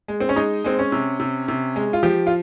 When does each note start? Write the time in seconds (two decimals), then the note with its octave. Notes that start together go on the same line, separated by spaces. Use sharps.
0.08 G#3
0.21 C4
0.29 C#4
0.36 G#3 D#4
0.64 G#3 C4
0.79 C#4
0.92 C3
1.20 C3
1.48 C3
1.76 G#3
1.93 F4
2.03 F3 G4
2.27 F4